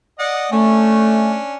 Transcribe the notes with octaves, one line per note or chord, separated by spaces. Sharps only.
D5 D#5 F#5
A3 C#4 D4